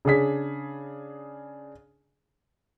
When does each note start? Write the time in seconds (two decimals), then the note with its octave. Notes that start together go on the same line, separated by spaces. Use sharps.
0.05 C#3 D4 G#4 B6